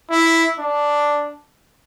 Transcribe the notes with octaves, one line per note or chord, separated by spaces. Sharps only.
E4
D4